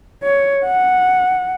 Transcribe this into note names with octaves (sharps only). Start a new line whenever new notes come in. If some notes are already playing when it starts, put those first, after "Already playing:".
C#5
F#5